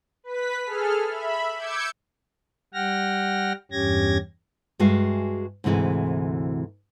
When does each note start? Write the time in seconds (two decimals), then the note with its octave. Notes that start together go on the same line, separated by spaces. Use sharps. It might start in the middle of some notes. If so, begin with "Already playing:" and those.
0.24 B4 B6
0.66 G#4 A4 F6
1.08 E5 B5
1.56 D6 E6 G6 G#6 C#7
2.74 G3 F#5 G5 F6 A#6
3.72 E2 G2 C#4 G4 G#6 A#6
4.79 G2 G#3 F#4 E5 F5 G#5
5.64 D2 G#2 C3 E3 G#4